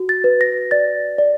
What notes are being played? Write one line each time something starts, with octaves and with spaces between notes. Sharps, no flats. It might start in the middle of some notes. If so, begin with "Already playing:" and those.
Already playing: F#4
A6
B4
A#6
D5 A6
D5